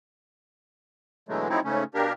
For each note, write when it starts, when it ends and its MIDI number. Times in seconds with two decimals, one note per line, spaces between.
1.29 1.48 47
1.29 1.48 50
1.29 1.48 52
1.29 1.48 54
1.29 1.48 56
1.29 1.48 57
1.49 1.60 53
1.49 1.60 54
1.49 1.60 57
1.49 1.60 60
1.49 1.60 63
1.49 1.60 64
1.64 1.84 44
1.64 1.84 49
1.64 1.84 57
1.64 1.84 61
1.94 2.13 47
1.94 2.13 58
1.94 2.13 62
1.94 2.13 67
1.94 2.13 70